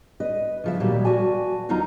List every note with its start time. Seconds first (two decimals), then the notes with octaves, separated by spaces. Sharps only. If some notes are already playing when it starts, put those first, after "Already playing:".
0.20 B4 D#5
0.64 C#3 F3 E5
0.80 D2 A#2 D#3 F#3 G3
1.04 F#4 B4 D5 G#5 A5
1.69 D#2 F#3 D#4 F4 D#5 A#5